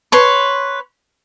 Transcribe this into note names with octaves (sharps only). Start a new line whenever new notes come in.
B4 C#5 C6